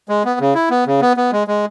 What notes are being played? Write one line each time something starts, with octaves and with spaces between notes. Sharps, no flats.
G#3
B3
C#3
E4
B3
C#3
B3
B3
G#3
G#3